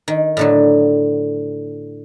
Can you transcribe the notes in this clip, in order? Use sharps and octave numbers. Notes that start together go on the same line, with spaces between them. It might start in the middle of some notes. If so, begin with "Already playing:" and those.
D#3
A2 D3 F#3